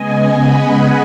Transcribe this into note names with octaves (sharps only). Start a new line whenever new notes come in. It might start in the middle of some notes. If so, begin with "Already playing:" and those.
Already playing: C#3 G#3 B3 D#5 G#5
F#5 B5